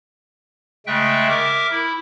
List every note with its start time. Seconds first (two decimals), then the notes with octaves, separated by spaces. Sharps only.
0.87 C#3 G#3 A3 E5 G5 F#6
1.28 A#4 E5 D6
1.71 E4